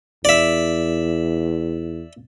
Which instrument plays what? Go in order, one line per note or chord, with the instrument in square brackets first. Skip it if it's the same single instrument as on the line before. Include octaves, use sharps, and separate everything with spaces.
[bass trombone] E2 [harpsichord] D5 E5